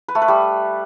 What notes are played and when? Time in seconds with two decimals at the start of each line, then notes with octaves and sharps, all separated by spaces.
0.08 B4
0.15 A3
0.22 B4
0.28 G3